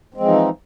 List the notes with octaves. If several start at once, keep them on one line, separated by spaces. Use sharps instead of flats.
E3 F3 G#3 C4 D#4